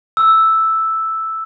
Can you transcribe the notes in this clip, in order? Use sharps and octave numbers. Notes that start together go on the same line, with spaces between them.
E6